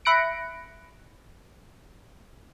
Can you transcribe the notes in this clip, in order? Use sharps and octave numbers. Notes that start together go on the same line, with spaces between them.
E5 B5 F#6 A#6 C#7 D7